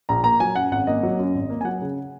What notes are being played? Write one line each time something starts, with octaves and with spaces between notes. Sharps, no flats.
A#1 A#5
A#3 A#5
F#3 G#5
F#2 F#5
G#1 F#5
A#3 D#5
F#3
F#2
G#1
A#3
G#5
F#3 F#5
C#3